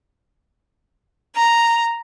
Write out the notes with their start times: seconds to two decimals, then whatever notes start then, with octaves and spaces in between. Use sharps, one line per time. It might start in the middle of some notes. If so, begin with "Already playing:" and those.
1.36 A#5